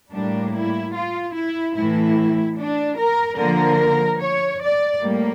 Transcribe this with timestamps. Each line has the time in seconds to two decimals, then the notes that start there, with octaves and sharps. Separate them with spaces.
0.11 A2 G3 A#3 D4
0.53 E4
0.93 F4
1.34 E4
1.74 A2 E3 A3 E4
2.56 D4
2.96 A#4
3.37 D3 F3 A#3 A#4
4.19 C#5
4.60 D5
5.00 A2 G3 A#3